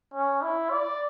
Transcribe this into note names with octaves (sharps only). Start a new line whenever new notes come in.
C#4
E4
D5